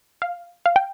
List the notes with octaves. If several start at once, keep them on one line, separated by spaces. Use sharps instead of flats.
F5
F5
G5